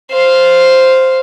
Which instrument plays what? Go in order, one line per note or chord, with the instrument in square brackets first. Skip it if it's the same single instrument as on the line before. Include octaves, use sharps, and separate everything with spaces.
[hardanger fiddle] C5 F5